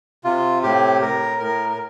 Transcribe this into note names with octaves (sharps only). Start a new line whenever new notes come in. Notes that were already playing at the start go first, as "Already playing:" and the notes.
C3 F4
A2 G4
A2 A#4
A2 A#4
A#4